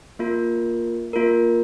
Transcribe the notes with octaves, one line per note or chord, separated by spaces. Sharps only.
A#3 F4 A#4
A#3 F4 A#4